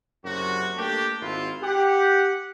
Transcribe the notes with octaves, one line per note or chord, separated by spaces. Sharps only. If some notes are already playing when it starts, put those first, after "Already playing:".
F#1 F#2 C3 F#4
A3 A#3 D4 G4
G#1 E4 F4
G4 F#5